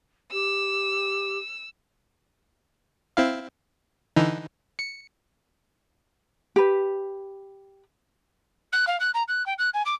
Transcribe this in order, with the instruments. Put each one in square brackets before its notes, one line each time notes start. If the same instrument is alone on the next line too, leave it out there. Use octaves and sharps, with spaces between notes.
[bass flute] G4 [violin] E6
[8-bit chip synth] C4 E4 F5
D3 E3 D#4
C#7
[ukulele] G4 B4
[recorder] F#6
F5
F#6
A#5
F#6
G5
F#6
G#5
D6